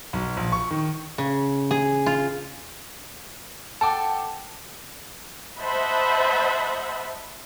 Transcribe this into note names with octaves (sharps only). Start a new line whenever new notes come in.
B1
A#1
C#6
D#3
C#3
G#4
F4
A4 F#5 G5 A5 D6
C5 D#5 E5 F#5 A5 B5